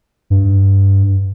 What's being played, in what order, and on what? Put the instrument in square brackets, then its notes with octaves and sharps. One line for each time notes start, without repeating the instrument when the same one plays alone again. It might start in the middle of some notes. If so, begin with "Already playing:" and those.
[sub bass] G2